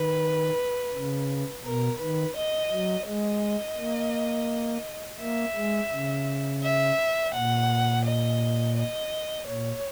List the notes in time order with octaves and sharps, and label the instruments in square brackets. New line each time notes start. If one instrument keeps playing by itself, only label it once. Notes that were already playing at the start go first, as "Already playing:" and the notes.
Already playing: [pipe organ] D#3 [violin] B4
[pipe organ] C#3
[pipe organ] B2 [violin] A#4
[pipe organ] D#3 [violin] B4
[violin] D#5
[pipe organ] F#3
[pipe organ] G#3 [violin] D#5
[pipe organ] A#3
[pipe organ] A#3 [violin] E5
[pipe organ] G#3
C#3
[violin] E5
[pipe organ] A#2 [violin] F#5
[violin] D#5
D#5
[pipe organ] A#2 [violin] C#5